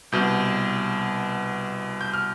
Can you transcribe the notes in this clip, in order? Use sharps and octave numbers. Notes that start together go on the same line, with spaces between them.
C2 B2 G6
G6
F6